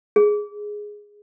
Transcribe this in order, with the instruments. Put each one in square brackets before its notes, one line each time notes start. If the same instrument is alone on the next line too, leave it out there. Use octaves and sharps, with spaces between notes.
[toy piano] G#4